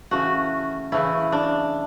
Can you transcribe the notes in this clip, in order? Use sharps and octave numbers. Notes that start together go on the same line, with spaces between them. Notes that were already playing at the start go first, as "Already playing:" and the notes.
C#3 E3 A3 C#4 F#4
C#3 E3 A3 C#4 E4
D4